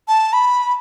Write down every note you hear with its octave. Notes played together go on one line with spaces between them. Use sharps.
A5
B5